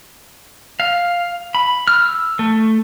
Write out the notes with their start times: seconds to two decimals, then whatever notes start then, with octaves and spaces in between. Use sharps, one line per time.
0.80 F5
1.55 B5
1.88 F6
2.02 E6
2.39 A3